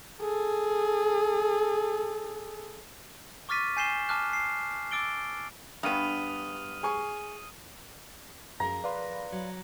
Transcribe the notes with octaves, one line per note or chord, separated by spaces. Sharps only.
G#4 A4
C#6 D6 F6 A6 B6 D#7
G#5 G6 C7 E7 G7
A5 D6 F6 F#6
C7
D6 E6 A6 D7 G7
G2 B3 D#6 F6 D#7
G#4 G#5 C#6
F#2 F3 G#4 A#4 A#5
B4 D5 F5 C6
F#3